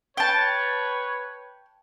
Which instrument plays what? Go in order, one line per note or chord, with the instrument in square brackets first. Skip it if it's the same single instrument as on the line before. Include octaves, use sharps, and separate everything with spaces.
[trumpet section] B4 C#5 [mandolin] G5 A5